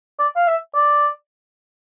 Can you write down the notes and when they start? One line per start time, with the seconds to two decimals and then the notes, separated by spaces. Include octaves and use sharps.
0.19 D5
0.36 F5
0.48 E5
0.75 D5